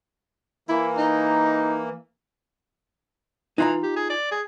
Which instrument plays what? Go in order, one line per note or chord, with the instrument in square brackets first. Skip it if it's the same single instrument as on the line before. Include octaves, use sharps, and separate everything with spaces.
[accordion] E3 A#3 [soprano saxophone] E4
[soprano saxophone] D#4
[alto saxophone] E3 [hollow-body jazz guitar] D#4 F4 A#5
[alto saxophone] G4
G#4
D5
G#4